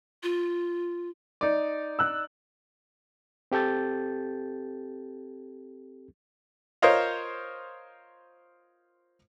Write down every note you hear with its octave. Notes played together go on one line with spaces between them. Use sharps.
F4
D#4 D5
E6 F#6
C4 G4 A4 G6 A6
F4 A#4 C5 C#5 D#5 F5